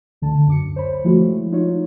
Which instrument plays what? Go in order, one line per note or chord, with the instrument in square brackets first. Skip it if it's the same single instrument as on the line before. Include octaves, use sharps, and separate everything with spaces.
[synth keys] D2 D3 A5
F#2 D6 C#7
C5 C#5 B5
F3 G#3 A3 E4 F#4
D#4 F4 C#5